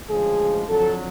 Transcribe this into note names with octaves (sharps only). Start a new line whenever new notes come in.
D2 C#3 F3 G#3 G#4
F2 D3 F#3 A4